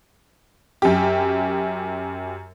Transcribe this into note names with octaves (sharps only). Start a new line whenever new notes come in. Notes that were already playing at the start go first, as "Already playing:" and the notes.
F#2 G4